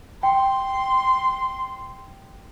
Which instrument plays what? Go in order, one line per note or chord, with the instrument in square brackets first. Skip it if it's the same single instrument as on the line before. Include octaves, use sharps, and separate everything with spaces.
[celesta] G5 [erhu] C6